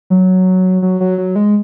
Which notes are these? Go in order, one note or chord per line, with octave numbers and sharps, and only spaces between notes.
F#3
F#3
F#3
F#3
G#3